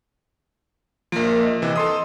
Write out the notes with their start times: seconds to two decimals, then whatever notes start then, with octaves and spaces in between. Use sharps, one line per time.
1.12 A#1 F3 A#3 A#4
1.43 D#5
1.62 C3 E3
1.75 A4 C6 D#6